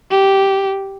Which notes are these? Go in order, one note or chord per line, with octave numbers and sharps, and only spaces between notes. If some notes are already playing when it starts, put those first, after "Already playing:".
G4